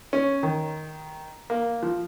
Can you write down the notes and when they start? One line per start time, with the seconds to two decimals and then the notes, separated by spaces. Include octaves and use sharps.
0.13 C#4
0.43 D#3
1.50 A#3
1.83 F3